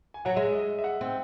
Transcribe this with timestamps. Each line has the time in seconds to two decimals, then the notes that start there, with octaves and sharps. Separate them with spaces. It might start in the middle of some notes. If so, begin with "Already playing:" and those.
0.14 G#5
0.25 F#3 F#5
0.36 G#3 E5
0.53 D#5
0.79 E5
0.84 F#5
1.01 C4